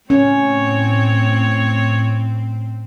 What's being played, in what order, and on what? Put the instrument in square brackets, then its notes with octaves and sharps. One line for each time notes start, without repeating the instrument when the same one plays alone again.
[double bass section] A2 [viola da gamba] C4 [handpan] C#4 [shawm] C#5